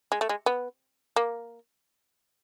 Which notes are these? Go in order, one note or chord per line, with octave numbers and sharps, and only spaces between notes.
G#3
A3
G#3
B3
A#3